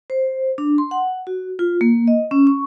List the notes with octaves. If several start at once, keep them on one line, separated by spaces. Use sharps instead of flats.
C5
D4
C6
F#5
F#4
F4
A#3
D#5
C#4
C#6